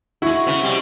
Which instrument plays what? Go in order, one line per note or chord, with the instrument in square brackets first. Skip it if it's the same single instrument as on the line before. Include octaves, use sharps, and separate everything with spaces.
[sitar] G#3 F#4 [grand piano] E4
[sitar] C#3 B3
C3 G3 G#3